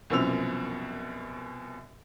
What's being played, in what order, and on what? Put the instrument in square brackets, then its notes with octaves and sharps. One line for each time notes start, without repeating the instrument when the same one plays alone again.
[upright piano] C2 F#2 B2 F3 E6 F7